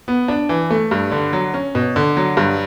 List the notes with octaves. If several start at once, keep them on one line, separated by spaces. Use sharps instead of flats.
B3
D4
E3
A3
G2
D3
F#3
C#4
B2
D3
F#3
G2